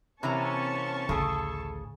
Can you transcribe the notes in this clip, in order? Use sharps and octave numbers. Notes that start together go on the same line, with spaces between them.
C3 E3 A#3 C4 C#4 A5 A#5 C#6
A1 D2 C#3 G#4 A4